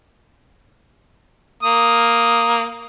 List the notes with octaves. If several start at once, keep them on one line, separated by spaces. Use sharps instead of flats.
A#3 D#6